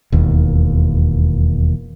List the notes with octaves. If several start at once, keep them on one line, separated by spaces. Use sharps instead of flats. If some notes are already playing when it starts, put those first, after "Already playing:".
E1 D#2